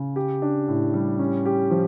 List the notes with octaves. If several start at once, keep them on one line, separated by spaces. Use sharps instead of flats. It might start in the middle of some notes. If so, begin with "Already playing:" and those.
Already playing: C#3
G4
D4
A2
G3
C#4
G4
F3